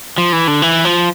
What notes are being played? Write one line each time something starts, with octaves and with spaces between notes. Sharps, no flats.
F3
E3
D3
E3
F3